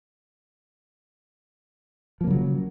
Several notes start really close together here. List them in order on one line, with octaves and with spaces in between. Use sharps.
F3 A#3 C#3 F#3